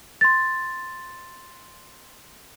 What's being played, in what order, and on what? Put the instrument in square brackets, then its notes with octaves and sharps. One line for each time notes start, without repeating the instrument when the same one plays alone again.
[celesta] C6 A6